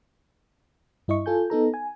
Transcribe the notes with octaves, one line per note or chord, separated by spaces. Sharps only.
G2 E4 D#5 C#6
F4 A4 G#5 G6
B3 D#4 A4 A#5
G#5